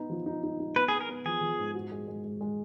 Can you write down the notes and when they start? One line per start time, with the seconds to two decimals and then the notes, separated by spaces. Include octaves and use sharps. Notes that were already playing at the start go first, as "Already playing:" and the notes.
Already playing: B3 D#4
0.10 F3
0.26 D#4
0.43 D#4
0.60 D#4
0.76 B3 B4
0.88 B3 G#4
1.01 A#4
1.09 B3
1.25 F3 G#4
1.41 F3
1.59 G#2
1.75 F#4
1.91 G#3
2.08 G#3
2.24 G#3
2.41 G#3